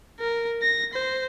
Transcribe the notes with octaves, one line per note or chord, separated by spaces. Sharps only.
A#4
A#6
C5